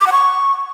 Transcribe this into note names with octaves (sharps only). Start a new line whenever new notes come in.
D6
F#5
C#6